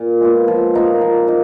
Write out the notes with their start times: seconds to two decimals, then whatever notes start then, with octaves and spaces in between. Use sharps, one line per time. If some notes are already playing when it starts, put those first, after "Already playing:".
Already playing: A#2
0.21 G#3 B3 F4
0.48 F3
0.74 A#3 D#4 F#4
1.01 F3
1.28 A#3 D#4